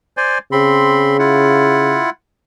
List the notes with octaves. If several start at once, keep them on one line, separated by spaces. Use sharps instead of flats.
C5 D5 G#5
C#3 C4 B5 C6
E4 F4 F#5